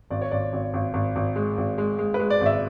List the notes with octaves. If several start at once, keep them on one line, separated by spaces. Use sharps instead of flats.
G#1 D5
C#5
G#1 D5
G#1
G#1
G#1
G#1
G#3
G#1
G#3
G#3
B4
G#3
D5
G#1
E5